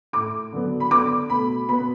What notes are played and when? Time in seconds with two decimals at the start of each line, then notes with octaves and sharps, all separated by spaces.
0.13 A2 A3 D6
0.52 D3 F#3 B3
0.80 B5
0.91 D3 B3 D6
1.30 B2 A3 B5
1.69 B2 B3 B5